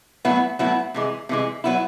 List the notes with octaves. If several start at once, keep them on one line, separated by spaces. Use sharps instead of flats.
A2 F#3 B3 E4
A2 F#3 B3 E4
C3 E3 G#3
C3 E3 G#3
F#3 B3 E4